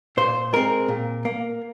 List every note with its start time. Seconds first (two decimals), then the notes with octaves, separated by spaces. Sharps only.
0.17 A#2 C5
0.53 G#3 C4 A#4
0.88 A#2
1.25 A#3